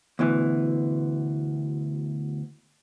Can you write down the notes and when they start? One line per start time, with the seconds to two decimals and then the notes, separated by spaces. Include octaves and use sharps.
0.19 D2 B2 E3